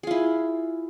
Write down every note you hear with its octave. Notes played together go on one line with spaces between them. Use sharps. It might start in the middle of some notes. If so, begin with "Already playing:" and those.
E4 F4 G#4